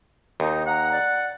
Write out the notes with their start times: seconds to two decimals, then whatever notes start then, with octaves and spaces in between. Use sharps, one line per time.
0.40 D#2 D#4
0.67 F#5 A#5
0.92 D5